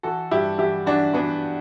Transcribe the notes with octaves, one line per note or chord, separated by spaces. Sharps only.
E3 F#4 A4
G2 E4 G4
E3 E4 G4
E3 D4 F#4
E3 B3 D4